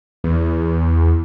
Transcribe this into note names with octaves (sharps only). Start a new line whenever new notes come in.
E2